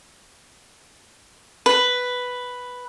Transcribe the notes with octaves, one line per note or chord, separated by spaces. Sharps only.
B4